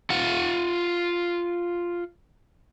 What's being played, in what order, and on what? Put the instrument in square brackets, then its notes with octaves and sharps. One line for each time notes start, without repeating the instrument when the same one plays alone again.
[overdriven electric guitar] F4 F#5